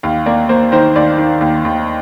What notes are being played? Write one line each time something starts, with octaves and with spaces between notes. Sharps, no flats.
D#2 F5
A#3 D5
A#3 C5
D#3 C5
D#2 D5
D#3
D#2
D#2